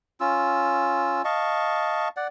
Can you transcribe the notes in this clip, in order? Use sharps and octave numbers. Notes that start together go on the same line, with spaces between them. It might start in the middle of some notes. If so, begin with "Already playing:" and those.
C#4 F4 E6
D#5 F5 A5 C#6
D5 F#5